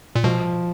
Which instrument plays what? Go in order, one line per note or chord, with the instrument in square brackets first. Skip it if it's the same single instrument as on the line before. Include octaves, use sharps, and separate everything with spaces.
[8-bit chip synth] A#2
[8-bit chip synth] B2 [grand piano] F3